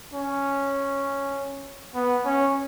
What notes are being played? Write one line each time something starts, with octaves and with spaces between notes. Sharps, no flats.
C#4
B3
C#4